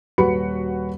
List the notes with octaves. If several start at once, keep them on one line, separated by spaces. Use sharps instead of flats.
D#1 F#4 B4 B5 C#7